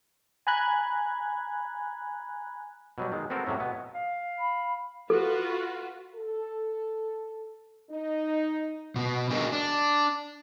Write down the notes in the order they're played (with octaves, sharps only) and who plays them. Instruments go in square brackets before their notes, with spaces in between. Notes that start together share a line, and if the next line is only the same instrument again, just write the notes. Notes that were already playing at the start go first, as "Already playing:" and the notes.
[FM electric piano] G#5 A#5 B5 F#6 G#6
[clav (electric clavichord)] B2 F#3 G3
D#3 G#3
B3 C4 F#4 A4 A#4
A2 C3 F#3 C#4
B2 B3
[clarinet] F5
[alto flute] B5
[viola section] F4 F#4 B4 [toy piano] A4
[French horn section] A4
D#4
[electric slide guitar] B2 B3
D4 F#4 G#4 A#4 D#5
D4